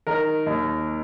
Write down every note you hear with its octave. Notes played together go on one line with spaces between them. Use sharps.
D#3 A#4
D#2